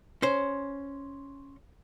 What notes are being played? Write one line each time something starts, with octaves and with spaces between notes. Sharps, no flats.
C#4 C5